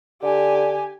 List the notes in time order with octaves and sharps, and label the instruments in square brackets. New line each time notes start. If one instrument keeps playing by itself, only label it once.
[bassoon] D3 [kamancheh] G4 G#5